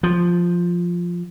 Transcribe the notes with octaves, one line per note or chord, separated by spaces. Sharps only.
F3